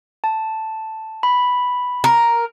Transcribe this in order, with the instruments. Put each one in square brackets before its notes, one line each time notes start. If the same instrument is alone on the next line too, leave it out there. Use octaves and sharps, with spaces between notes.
[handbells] A5
B5
[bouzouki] A#4